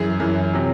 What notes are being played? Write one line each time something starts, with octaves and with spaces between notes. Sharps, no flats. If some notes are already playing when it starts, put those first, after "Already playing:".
Already playing: F#2 E3 G#4
F#2 E3
C3 F#3